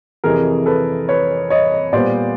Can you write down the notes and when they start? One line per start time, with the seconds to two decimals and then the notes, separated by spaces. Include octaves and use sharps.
0.24 F2 C3 E3 G#4 A#4
0.66 A4 B4
1.09 B4 C#5
1.50 C#5 D#5
1.92 A#2 G3 B3 C5 D5